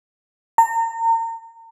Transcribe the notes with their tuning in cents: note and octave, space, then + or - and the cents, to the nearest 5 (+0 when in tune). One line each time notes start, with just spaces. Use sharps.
A#5 -35